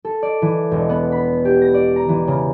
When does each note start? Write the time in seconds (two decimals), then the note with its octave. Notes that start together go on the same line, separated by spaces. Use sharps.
0.05 A4
0.23 D5
0.42 E3
0.71 E1
0.89 B3
1.12 B5
1.45 G4
1.62 A#6
1.74 D5
1.96 A#5
2.09 E3
2.28 C#3